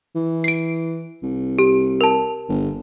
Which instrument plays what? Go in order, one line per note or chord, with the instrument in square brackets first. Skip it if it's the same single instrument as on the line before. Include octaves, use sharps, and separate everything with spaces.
[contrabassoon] E3
[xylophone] C7 D7
[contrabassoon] C2
[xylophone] G4
A#4 A5
[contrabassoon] G1